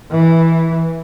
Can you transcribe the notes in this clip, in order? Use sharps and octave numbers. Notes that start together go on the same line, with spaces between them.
E3